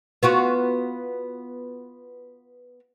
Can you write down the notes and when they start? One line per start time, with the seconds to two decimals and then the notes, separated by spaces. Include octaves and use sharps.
0.23 B3 F4 F#4